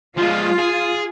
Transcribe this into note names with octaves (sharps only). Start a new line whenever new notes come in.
F3 G#3 F4
G#4